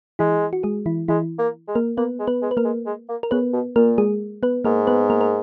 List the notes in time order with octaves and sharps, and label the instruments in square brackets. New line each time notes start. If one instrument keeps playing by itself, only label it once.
[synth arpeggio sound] E3 E4 [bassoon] G#3
[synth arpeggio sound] F#4
G#3 G#4
E3 E4
[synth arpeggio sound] E3 E4 [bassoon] G#3
[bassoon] A#3
G#3
[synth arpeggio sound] A#3 A#4
[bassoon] A#3 [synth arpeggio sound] B3 B4
[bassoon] G#3
[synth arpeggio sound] B3 B4
[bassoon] G#3
[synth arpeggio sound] B4
A#3 A#4
[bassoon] G#3
G#3
A#3
[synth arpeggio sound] A#4
[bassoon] C#3 [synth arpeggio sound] B3 B4
[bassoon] B2
[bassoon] A#2 [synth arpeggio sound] A#3 A#4
[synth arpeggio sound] G#3 G#4
B3 B4
[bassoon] G#2 [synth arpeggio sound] A#3 A#4
[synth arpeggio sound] B3 B4
A#3 A#4
A#4